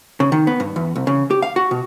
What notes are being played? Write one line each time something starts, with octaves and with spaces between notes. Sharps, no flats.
C#3
D#3
B3
G2
E2
C2
C#3
G4
F5
F#4
B2